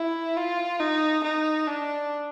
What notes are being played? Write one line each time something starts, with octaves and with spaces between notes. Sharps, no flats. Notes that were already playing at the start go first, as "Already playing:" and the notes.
Already playing: E4
F4
D#4
D#4
D4